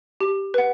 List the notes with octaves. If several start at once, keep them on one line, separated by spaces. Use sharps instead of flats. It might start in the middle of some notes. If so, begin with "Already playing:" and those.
G4
B4 F#5